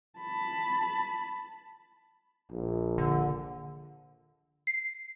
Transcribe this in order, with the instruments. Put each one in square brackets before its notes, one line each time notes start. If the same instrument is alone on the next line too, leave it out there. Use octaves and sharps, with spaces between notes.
[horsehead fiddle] A5 B5
[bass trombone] A#1
[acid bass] D3
[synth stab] C7